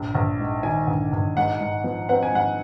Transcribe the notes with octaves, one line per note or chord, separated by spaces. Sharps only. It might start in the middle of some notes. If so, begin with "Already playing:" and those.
Already playing: A#1
A#1
G#2
D#3 G#5
A#1
A#1
G#2 F#5
G#2
F3
C4 F#5
G#5
G#2 F#5